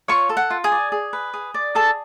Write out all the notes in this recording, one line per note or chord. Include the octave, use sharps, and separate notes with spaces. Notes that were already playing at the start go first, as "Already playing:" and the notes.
F4 C#5 C#6
A4
F#5
F4
G#4 G#5
D5
G#4
B4
G#4
D5
G#4 A4 A5